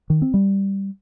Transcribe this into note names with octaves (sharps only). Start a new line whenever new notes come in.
D#3
C4
G3